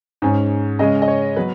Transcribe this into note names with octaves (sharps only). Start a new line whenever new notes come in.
G#2 G#3 C#4
C#3 G#3 C#4 D#5
D#5
C#5
F#3 B3 B4